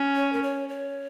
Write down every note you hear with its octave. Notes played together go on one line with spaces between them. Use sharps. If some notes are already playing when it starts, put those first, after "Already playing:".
Already playing: C#4
C#5
A#4
C#5
C#5